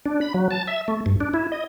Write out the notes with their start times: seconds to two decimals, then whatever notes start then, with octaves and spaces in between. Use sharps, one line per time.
0.06 D4
0.21 B5
0.34 F#3
0.51 A5
0.67 E5
0.88 A3
1.06 G2
1.20 D4
1.34 E4
1.52 D#5